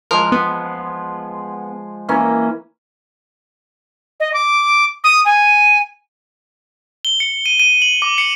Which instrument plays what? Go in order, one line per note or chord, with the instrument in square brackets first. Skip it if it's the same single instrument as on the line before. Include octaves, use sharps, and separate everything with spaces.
[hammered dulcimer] F3 G#3 [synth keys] A#4
[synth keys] B3
[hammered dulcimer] E3 A#3 C#4
[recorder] D#5
D6
D#6
G#5
[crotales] G7
C#7
D#7
D#7
F#7
D6
C#7